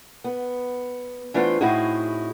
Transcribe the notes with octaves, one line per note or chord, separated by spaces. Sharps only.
B3
E3 A3 B3 D4 F4 C5
A2 C4 D#4 E4 F#4 G#4